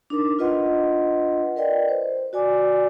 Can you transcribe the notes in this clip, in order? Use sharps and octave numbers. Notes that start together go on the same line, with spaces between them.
D4 D#4 A#4 D6
D4 F4 B4 D#5 F#5 C6
A#4 B4 D5 D#5 G5
C5
F#4 D5 G#5 D6